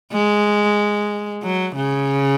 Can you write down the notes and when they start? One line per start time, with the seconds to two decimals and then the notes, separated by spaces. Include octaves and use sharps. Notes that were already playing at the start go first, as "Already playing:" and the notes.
0.12 G#3
1.43 F#3
1.76 C#3